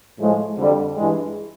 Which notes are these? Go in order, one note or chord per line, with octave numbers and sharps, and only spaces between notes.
A2 F3 G#3
F2 D3 G3
G2 E3 G#3